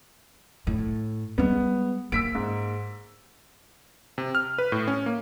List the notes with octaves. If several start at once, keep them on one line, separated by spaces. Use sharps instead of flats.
A2
G3 G#3 B3
A#3 E6 B6 D7
G#2
C3
F6
B4
A2
C#4
A#3